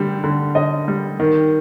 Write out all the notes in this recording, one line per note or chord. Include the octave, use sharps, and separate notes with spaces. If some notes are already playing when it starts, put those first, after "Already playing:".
Already playing: D3 G3
D3
D3 D#5
G3
D#3